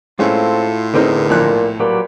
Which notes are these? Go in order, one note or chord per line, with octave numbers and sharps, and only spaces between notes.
A2 G#3 C4 C#4 F4 A4 B4
E2 D3 A#3 C4 D#4 A#4 D#5
B1 A#2 F3 F#6
A#2 F#3 G4 B4